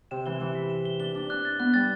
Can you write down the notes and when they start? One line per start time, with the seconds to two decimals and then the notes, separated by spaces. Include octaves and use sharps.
0.11 C3 E7
0.26 E3 G7
0.40 E3 E7
0.55 B6
0.70 E7
0.85 G7
1.00 D4 G7
1.15 D4 G7
1.29 D4 F#6
1.45 A6
1.59 B3 F#6
1.74 G3 A6